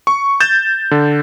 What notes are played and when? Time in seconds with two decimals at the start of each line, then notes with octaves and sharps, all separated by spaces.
0.07 C#6
0.40 G6 A6 E7
0.91 D3